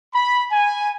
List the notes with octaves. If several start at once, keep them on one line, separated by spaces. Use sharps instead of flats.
B5
G#5